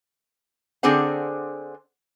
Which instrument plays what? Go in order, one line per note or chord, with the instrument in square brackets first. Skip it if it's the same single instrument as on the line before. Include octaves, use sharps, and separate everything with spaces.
[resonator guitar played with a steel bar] D3 C4 D4 G#4 C5 F#5